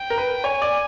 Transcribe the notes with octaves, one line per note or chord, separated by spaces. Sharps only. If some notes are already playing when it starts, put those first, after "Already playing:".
Already playing: G5
A#4
B4
C#5 G#5
D5